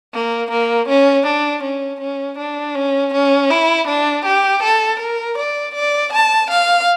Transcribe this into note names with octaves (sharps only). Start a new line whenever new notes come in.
A#3
A#3
C#4
D4
C#4
C#4
D4
C#4
C#4
E4
D4
G4
A4
A#4
D5
D5
A5
F5